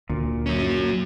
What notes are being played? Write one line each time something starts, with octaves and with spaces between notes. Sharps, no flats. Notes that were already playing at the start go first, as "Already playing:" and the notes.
D2 A#2
F#3 C#4